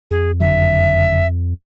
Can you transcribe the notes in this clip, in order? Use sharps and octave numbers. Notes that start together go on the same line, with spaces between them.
F2 G#4
F#1 D3 F#3 E5